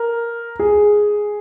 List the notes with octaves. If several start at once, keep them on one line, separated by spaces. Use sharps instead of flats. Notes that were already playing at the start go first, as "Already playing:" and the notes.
Already playing: A#4
G#4